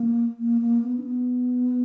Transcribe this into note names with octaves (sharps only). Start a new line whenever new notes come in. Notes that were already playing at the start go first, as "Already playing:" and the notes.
Already playing: A#3
A#3
A#3
B3
D4
B3